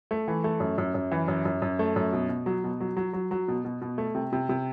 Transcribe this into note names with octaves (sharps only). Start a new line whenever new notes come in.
A3
E3
A3
F#2
F#2
F#2
E3
F#2
F#2
F#2
A3
F#2
B2
B2
F#3
B2
F#3
F#3
F#3
F#3
B2
B2
B2
A3
C3
C3
C3